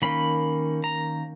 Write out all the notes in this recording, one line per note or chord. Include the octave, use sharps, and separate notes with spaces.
D#3 A#3 C#4 B5
A#5